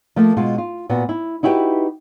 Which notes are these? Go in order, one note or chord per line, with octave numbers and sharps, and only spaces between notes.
F3 A3 A#3
B2 G#3 F4
F4
A#2 B3 F#4
E4
D#4 E4 F#4 G4 A#4 B4